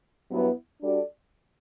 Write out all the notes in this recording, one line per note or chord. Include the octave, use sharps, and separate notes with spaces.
G2 F#3 B3 E4
G3 D4 F#4 A4 D5